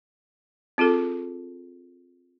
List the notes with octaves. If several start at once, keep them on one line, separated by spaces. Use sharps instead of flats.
C4 F4 G#4 A4